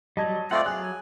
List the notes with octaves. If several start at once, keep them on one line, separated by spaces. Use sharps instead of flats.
F#3 G3 D#5 A5 G#6
A3 C4 F4 D5 F#5
F#3 G#4 F#6
G#5